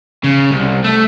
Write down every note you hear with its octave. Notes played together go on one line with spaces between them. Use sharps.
C#3
C2
A3